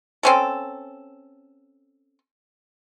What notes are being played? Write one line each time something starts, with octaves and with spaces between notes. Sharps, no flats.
C4 C#4 A4